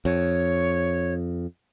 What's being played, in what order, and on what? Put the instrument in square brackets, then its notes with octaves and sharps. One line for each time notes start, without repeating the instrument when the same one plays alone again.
[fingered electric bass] F2 [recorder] C#5